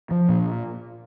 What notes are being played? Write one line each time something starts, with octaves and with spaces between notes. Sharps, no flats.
F3
A#2